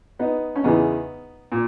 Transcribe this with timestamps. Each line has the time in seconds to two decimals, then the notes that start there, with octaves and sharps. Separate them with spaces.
0.19 B3 D#4
0.56 C#4
0.63 E2 C#3 E3 B3 D#4
1.52 A#2